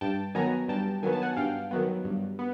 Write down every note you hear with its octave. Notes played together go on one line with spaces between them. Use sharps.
G2 G5 A5
D#3 F#3 B3 G#5 A#5
G2 G5 A5
D#3 F#3 B3 G#5
A5
F#5 G#5
G2 F5 G5
D#3 F#3 B3
G2
B3